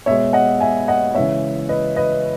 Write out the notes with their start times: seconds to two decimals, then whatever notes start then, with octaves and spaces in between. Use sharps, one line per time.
0.06 B2 C#5 E5
0.11 G#3
0.33 D#5 F#5
0.60 E5 G#5
0.88 D#5 F#5
1.14 C#3 E3 G#3 C#5 E5
1.69 B4 D#5
1.96 B4 D#5